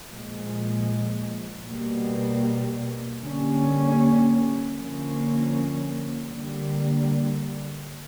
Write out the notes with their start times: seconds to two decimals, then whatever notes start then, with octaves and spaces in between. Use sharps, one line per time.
0.11 A#2 F3 G#3
1.66 B2 G3 A#3
3.20 D3 G3 A#3 C#4
4.75 D3 F3 A#3 C#4
6.30 D3 G3 A#3